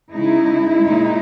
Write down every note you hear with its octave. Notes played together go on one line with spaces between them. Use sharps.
C#3 G#3 D#4 E4
A#2 G#3 D#4